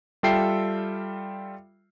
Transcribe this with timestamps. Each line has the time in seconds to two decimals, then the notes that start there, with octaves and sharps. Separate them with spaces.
0.23 G3 F4 A4 E5 G5 C7